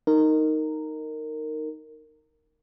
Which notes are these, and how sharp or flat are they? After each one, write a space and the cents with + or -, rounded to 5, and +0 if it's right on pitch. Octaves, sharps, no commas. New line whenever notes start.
D#4 +0 A#4 -15